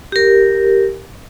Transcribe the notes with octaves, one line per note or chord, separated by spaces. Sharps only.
G4 A#4